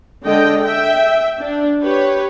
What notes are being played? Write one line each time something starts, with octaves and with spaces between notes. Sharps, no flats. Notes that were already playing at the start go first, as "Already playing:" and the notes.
D3 G#3 D#5 G5
E5 G5
D4
G4 B4 C#5